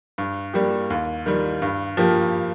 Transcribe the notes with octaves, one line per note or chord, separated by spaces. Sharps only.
G2
G3 A#3 G4
D#2
D#3 G3
G2
F3 A#3 G4